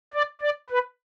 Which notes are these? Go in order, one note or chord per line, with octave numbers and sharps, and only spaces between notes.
D5
D5
B4